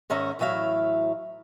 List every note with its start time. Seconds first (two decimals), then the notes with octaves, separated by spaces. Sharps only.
0.10 G#2 D#3 C#4 E5 A#5
0.39 A2 E3 F#3 E5 F5